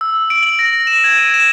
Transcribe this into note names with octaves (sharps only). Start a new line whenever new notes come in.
E6
D7
F#7
A#6
E7
G#6
D#7
E7